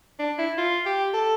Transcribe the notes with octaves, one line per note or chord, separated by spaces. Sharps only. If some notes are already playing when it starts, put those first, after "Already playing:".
D4
E4
F4
G4
A4